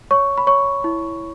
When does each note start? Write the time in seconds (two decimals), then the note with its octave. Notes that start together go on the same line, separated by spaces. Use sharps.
0.11 C#5 C#6
0.38 B5
0.47 C#5 C#6
0.84 E4